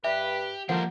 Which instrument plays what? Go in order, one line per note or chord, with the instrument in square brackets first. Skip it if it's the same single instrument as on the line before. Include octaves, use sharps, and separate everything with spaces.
[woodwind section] G2 B4 [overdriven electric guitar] G4 [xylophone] E5
[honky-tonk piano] F3 [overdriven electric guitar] G3 A#3 [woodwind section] A4 A#4 C5 [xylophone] F#5